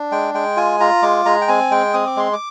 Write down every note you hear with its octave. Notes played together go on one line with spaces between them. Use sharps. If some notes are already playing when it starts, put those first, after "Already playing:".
Already playing: D4
G#3 G5
G#3 G5
F4 G#5
F4 A#5
G#3 D6
G#3 A#5
G5
C4 G#5
G#3 G5
C4 D#6
D6
G#3 C6
D6